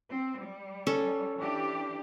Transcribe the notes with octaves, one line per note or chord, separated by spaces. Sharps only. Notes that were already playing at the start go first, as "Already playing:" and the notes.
C4
G3
C#4 A4
E3 D4 G4